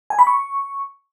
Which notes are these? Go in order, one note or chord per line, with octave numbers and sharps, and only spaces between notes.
G#5
B5
C#6